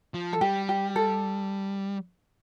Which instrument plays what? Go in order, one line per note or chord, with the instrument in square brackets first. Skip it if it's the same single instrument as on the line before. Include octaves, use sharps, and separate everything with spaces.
[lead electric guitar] F3
[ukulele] A4
[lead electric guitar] G3 [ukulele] G4
[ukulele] G4
A4